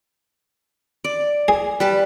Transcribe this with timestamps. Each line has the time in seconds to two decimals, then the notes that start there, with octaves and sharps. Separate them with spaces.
1.04 D5
1.48 G#4
1.80 G3 B4 A5